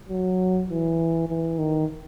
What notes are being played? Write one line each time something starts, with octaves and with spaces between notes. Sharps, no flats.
F#3
E3
E3
D#3